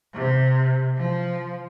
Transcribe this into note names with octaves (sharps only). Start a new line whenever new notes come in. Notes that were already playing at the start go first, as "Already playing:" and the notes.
C3
F3